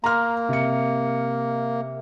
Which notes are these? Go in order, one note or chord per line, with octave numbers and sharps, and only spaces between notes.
A#3 A#5 C6 F6
C3 C#7